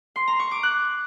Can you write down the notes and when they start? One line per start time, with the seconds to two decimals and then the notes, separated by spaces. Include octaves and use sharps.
0.16 C6
0.28 A#5
0.39 C#6
0.51 D6
0.63 F#6